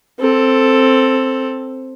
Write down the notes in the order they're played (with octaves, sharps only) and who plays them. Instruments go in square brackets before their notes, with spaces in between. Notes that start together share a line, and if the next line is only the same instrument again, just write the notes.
[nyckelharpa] C4 A4